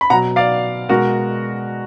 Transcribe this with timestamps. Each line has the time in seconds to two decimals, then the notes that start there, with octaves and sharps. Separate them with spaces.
0.01 B5
0.10 B2 F#5 A#5
0.13 F#3
0.36 D5 F5
0.89 B2 G#3 F#4 A#4